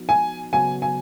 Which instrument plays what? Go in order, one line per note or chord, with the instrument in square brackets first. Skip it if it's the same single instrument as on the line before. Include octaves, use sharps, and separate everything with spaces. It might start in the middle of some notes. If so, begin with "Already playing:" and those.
Already playing: [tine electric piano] F3 B3 D#4 F#4
[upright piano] G#5
[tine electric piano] C#3 F#3 B3 F#4 [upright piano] G#5
[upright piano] G#5